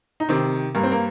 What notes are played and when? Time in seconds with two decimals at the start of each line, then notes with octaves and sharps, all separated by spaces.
0.20 D#4
0.29 C3 D#3 C4
0.75 G2 A#3
0.83 C4
0.91 A#3